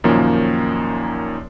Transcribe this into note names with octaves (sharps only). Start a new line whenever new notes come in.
F#2 A#2 D#3 F3 A#3 C#4